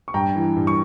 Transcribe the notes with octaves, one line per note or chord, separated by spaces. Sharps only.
C#6
G2 G5 A#5
E3
G2
C#6